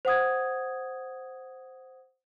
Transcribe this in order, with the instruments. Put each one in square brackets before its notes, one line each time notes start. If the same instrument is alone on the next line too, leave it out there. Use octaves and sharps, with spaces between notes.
[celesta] C5 F#5 D#6 G#6